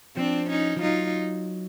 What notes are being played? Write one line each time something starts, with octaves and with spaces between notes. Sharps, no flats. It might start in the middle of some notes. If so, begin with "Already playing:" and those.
F3 C4 D4
C#4 D#4
F3
F#3 D#4 F4